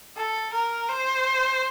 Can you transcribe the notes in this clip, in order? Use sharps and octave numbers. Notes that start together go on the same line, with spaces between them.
A4
A#4
C5